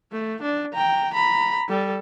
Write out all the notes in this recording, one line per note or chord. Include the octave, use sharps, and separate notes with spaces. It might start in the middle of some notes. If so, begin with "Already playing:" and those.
A3
D4
G5 A#5
A#5 B5
G3 A4